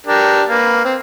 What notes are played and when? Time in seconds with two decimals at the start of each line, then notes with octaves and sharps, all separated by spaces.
0.07 D4 G4 A#4
0.48 A#3 B4
0.85 C4